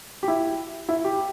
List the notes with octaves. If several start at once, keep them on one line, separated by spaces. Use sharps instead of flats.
G4
E4
E4
G4